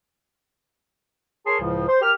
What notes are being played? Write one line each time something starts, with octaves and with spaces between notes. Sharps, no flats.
G#4 A#4 C#5 A5 C6
C#2 A2 C#3 F3
C5
G4 A#4 F6